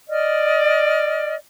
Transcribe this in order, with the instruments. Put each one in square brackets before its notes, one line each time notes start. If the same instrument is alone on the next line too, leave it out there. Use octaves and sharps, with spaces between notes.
[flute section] D5 D#5 F6